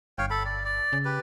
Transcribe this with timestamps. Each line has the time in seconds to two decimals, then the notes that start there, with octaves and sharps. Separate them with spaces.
0.18 G1 C#5 F5 G5
0.30 A4 B5
0.45 D5
0.65 D5
0.93 C#3
1.05 G4 B4